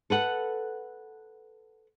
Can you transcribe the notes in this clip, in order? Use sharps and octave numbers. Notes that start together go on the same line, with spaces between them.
A4 B4 F#5